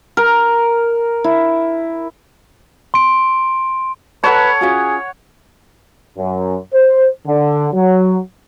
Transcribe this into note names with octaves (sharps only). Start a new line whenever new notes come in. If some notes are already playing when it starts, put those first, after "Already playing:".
A#4
E4
C6 D7
A4 B4 C#5 F#5 A5
C#4 F4 F#4 G#4
F#2
C5
D3
F#3